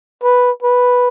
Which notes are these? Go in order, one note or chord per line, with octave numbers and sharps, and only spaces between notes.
B4
B4